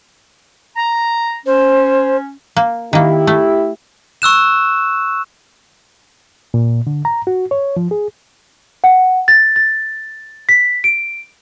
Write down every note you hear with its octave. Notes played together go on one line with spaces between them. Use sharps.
A#5
C#4 C5
A#3
D#3 A#3 E4 G4
A3
C#6 E6 F#6 E7
A#2
D3
A#5
F#4
C#5
F3
G#4
F#5
A6
A6
B6
D7